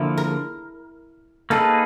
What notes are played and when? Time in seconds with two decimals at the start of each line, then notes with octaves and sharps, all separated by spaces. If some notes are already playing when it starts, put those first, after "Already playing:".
Already playing: D3 F3 A#3 E4
0.17 A#4
1.50 A#3 D#4 G#4 A4 B4